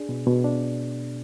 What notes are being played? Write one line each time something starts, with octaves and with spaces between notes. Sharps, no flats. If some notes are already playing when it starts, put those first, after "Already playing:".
Already playing: D4 G#4
B2
B2
D4